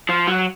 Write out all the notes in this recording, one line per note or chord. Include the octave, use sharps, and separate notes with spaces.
F3
F#3